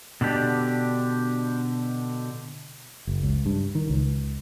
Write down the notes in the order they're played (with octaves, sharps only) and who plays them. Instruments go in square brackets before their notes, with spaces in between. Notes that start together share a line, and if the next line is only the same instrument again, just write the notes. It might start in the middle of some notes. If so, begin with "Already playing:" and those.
[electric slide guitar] B2 D3 D4 G4
[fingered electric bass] F#1
C#2
G2
D#3
C#2